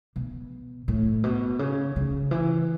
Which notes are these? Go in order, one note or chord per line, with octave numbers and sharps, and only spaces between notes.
B2
A2
B2
C#3
C#3
E3